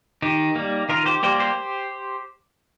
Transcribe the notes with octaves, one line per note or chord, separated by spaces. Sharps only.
D#3 D#4 G4
G3 A#3
D#3 F4 A#4
G4 C5
G3 A#3 G4 C5
G4 C5